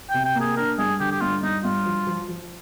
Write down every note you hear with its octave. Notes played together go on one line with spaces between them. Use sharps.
C3 G5
G5
A#3
G#4
D4 A#4
G2 G#4
D3 G4
G4
G2 F4
G2 D#4
G2 F4
F3
F3
F3